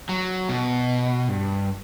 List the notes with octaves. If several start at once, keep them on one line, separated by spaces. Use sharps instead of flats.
F#3
B2
G2